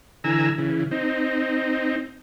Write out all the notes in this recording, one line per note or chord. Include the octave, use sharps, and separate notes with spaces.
D3 E3 G#5 A#5 E6
C#3 E3
C4 D#4